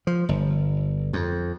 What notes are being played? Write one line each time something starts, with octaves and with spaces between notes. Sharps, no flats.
F3
G1
F2